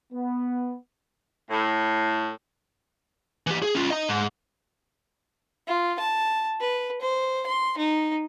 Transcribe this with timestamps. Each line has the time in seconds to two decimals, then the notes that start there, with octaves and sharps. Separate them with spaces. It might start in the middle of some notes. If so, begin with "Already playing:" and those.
0.13 B3
1.51 A2
3.47 E3 G4
3.63 G#4
3.75 C#4 F4
3.90 D#5 A#5
4.09 G#2
5.67 F4
5.99 A5
6.60 B4
7.01 C5
7.46 C6
7.78 D#4